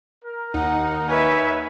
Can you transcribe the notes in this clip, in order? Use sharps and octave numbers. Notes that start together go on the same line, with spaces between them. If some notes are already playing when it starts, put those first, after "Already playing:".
A#4
D#2 D#4 F#5
A#4 B4 C#5 E5 G#5